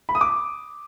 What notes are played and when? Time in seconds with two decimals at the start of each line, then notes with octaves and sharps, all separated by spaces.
0.09 B5
0.15 D#6
0.21 D6